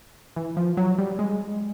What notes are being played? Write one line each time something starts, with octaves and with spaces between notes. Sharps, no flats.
E3
F3
F#3
G3
G#3